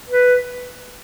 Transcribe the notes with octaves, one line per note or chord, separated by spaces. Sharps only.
B4